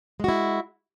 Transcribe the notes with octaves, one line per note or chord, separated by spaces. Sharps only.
G#3 E4 F#4